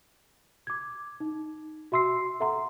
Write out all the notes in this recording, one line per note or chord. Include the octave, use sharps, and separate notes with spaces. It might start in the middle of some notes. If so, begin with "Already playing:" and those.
D6 G#6
D#4
F#4 E5 C6 E6 C7
A4 E5 F#5 A#5 C6